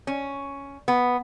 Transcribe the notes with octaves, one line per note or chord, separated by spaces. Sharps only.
C#4
B3